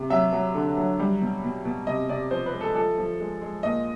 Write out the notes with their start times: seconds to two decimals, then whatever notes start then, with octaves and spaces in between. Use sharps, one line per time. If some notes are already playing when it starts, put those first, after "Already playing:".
Already playing: C3
0.10 F#3 E5
0.32 F#3
0.54 D3
0.77 F#3
0.99 G3
1.21 B2
1.43 B2
1.65 B2
1.87 C3 D#5
2.09 C3 D5
2.31 F3 C5
2.46 B4
2.54 G#3
2.61 A4
2.75 F3 A4
2.98 F3
3.20 G#3
3.42 G#3
3.63 A#2 D#5